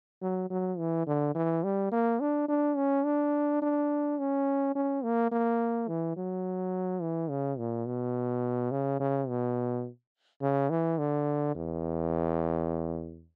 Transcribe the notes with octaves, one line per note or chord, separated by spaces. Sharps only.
F#3
F#3
E3
D3
E3
G3
A#3
D4
D4
C#4
D4
D4
C#4
C#4
A#3
A#3
E3
F#3
E3
C#3
A#2
B2
C#3
C#3
B2
C#3
E3
D3
E2